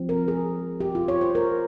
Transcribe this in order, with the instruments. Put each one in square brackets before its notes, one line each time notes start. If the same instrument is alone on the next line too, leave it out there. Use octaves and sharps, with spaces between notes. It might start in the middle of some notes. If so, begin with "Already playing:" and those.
Already playing: [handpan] F3 C4
A#4
G#4
G4
F4
C#5
C5
A#4